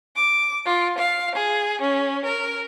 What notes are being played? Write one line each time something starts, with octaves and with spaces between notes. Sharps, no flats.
D6
F4
F5
G#4
C#4
A#4